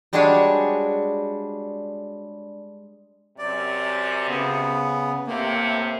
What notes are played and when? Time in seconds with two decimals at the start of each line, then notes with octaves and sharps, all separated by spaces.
0.13 G3 G#3 D4 F#4 G#4 C#5
3.38 F#2 C3 D5
4.29 C#3 B3
5.27 A2 C3 A#3